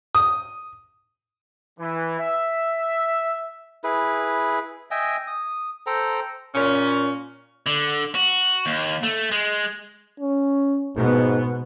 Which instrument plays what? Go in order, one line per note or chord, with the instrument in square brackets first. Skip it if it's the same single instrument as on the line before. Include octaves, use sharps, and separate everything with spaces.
[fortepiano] D#6
[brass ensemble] E3
E5
[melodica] E4 G#4 B4
D#5 E5 G5 G#5
D#6
A4 C5 G5 A#5
[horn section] A#2 C#4
[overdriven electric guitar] D3
F#4
D#2
A3
G#3
[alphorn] C#4
[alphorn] G#2 [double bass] B2 B3